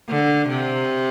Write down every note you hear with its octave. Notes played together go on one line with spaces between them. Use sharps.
D3
C3